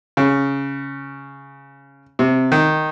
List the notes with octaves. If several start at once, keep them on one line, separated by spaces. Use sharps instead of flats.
C#3
C3
D#3